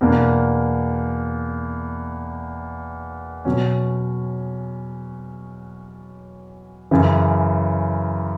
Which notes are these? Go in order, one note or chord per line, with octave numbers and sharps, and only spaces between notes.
E2 B2 A#3 D4
B2 F#3 C#4
F#2 C#3 E3